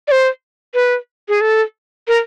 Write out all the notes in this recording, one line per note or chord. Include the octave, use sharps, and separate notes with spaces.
D5
C5
B4
G#4
A4
A#4